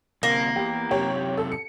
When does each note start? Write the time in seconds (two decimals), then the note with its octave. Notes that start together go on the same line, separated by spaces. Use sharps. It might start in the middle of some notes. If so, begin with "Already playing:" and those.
0.23 D2 C3 A#3
0.56 E2 G4
0.91 F#2 C3 G4 C#5
1.37 A4
1.52 C#7